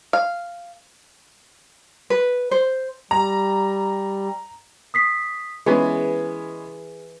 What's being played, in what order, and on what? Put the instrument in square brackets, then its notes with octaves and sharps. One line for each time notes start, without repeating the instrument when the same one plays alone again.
[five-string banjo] F5
[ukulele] B4
C5
[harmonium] G3 [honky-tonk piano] A#5
[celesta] D#6 B6 C7
[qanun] E3 [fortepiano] G#3 B3 C#4 [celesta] G#4 G#5